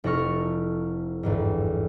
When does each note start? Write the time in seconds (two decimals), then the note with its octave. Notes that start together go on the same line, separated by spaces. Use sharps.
0.04 F1 E4 A4 A#5 C#6 F6
1.23 G1 E2 G#2